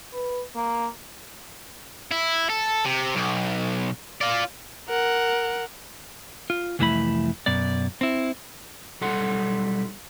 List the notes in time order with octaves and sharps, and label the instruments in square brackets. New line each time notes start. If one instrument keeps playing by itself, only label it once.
[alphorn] B4
A#3
[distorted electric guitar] E4
A4
C3
B1
F4 D5
[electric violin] A#4 F#5
[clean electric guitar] F4
C2 F2 E3 A3 E4 B5
F#2 B2 D5
C4 E4
B1 G3 A4 F#5 C6